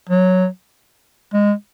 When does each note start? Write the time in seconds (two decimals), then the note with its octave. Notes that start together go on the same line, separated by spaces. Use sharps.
0.09 F#3
1.33 G#3